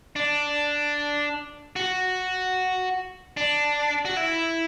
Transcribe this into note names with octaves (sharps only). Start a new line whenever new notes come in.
D4
F#4
D4
F#4
E4